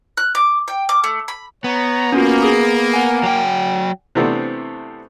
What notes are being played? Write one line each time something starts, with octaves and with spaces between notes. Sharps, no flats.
F#6
D6
G5
D6
A3
B5
B3 C#5 A#5
A#3 C#4 F4 F#4
G#4 D#6
F#5 G#5
F#3 G5
C3 E3 A3 B3 C4 D4